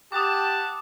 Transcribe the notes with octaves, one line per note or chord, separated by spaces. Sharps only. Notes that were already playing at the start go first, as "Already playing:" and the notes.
G4 F#5 A5 D6 D#6